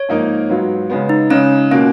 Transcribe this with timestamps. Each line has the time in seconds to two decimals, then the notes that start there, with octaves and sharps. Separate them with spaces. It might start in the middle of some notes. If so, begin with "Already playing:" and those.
Already playing: C#5
0.09 G#2 F3 A#3 D#4 A#4
0.49 G#2 F#3 B3 F4
0.90 C#3 G#3 B3
1.09 D#4
1.30 C#3 G#3 C#4 D#4
1.71 B2 A#3 C#4 F4